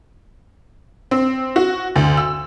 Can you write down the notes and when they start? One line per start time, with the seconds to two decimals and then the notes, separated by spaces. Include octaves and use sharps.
1.11 C4
1.56 F#4
1.96 D2
2.17 E6